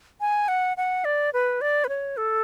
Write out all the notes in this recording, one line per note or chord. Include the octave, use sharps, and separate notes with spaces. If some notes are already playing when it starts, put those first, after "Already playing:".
G#5
F#5
F#5
D5
B4
D5
B4
C#5
A4